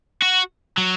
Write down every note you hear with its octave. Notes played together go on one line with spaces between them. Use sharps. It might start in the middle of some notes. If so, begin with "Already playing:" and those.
F#4
F#3